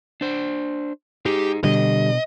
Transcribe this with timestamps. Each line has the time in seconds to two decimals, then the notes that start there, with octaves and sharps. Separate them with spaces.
0.21 D4 C5
1.26 D#4 G4 G#4
1.64 B2 D3 G3 D4 D#5